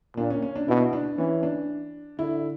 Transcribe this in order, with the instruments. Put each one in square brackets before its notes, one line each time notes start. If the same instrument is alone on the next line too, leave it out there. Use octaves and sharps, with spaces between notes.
[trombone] A#2 [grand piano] D4
[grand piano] C#4
C#4
D4
[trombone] B2 [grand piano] E4
[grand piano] D4
[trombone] E3 [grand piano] C#4
[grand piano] D4
[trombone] D3 [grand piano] E4